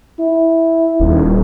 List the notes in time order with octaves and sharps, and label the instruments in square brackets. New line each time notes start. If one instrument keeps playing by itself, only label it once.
[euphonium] E4
[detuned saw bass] D#1